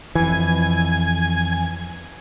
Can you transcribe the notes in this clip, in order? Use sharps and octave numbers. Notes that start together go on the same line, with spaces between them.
F2 E3 G#5